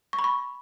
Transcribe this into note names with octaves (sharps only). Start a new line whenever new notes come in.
C#6
B5
C#6